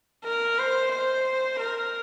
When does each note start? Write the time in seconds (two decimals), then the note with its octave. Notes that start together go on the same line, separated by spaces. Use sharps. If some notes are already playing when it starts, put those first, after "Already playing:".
0.24 A#4
0.58 C5
0.93 C5
1.60 A#4